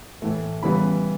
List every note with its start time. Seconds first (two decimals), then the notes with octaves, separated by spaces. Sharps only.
0.22 A2 E3 A3
0.63 C#3 E3 G3 B3 B5